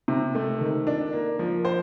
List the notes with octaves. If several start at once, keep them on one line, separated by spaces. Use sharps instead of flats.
C3
A3
D#3
D4
A#3
F3
C5